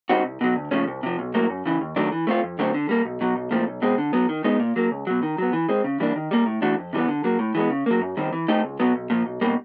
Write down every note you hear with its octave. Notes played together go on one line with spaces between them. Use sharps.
G3 C4 D#4 F#4
C2
B2 F#3
D2
C#3 F3 A3 C#4
C2
C3 F3
B1
A2 F#3 A#3
F#2
C#3 E3
D#2
D#3 F#3 A3 D4
E3
A3 C4 F4
F2
D3 F#3 A3 C4
D3
G3 A#3
B1
B2 F#3
B1
A#2 F3 A3 C4
B1
B2 G#3 C4
D3
F#3 B3
D#3
G#3 B3 D#4
A#2
F#3 A#3
C#2
B2 F#3
D#3
F#3 B3
E3
G#3 C4
C#3
E3 G3 A#3 D4
D#3
G3 A#3
A2
E3 A3 D4 F#4
F2
C3 E3 G3 B3
D3
F#3 A#3
A2
E3 G#3 B3
C#3
F#3 A#3
F#2
D#3 G3 C4
E3
A3 C4 D#4 G4
C#2
B2 F#3 B3
B1
A#2 F3
B1
B2 G3 A#3